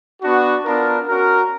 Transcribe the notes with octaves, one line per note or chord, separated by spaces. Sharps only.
B3 D4 F#4
B3 D4 F4 A#4
C#4 F#4 A#4